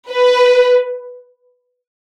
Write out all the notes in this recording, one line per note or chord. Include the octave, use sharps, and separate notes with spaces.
B4